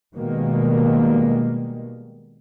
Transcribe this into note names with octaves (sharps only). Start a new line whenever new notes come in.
B2 D#3 G3 G#3 A#3